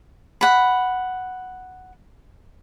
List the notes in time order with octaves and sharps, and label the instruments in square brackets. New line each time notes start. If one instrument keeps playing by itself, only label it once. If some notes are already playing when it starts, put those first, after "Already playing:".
[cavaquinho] F#5 B5